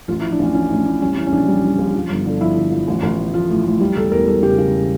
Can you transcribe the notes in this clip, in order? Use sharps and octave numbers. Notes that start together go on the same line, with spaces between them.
A1 F4
E4
F3
D4
A1 C#4
F3 C#4
A2 D4
A2 D4
G3 C#4
E3 C#4
C#4
A#1 D4
G3
G3
A#1
F3
G1
D3
F3 E4
D3
F3
A1
A1
A2
F3 F4
A2
A2
G3
E1 A4
E2 A#4
G3 A4
C#3 G4
C#3 G4